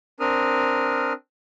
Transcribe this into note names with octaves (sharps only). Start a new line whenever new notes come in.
C4 D4 A#4 D#6 F6